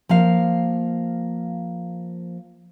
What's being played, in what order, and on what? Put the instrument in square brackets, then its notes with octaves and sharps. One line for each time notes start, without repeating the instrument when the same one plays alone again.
[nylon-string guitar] F3 A#3 F5